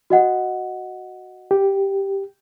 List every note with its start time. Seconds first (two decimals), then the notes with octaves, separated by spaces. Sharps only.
0.10 F#4 D#5 F#5
1.51 G4